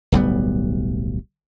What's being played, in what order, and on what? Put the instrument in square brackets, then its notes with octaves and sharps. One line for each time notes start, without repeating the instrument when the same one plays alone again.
[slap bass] D1 B1 G3 B3